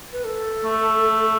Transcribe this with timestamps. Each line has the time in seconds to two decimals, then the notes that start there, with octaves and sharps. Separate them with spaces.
0.13 B4
0.25 A4
0.64 A3